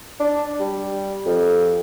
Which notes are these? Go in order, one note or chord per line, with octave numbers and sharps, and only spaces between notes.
D4
G3
F2